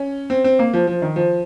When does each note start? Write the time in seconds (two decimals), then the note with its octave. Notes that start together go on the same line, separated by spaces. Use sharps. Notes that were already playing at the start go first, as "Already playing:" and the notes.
Already playing: C#4
0.30 C4
0.44 C4
0.59 A#3
0.73 F3
0.87 F3
1.02 D#3
1.16 F3